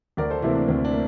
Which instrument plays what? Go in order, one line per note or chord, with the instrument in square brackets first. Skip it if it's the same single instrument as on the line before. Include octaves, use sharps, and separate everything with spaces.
[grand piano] D2 A#4 D5
A4 C5
C3 E3 A#3 C4 E4
D4
D2 C4
D4
A#3